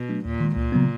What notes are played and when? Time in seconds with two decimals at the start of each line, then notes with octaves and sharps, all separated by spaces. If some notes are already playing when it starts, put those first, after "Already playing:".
Already playing: B2
0.09 F#3 A3 D4
0.25 D#2 A#2
0.40 D#3 G#3
0.56 C#2 A#2
0.72 C#3 F#3 B3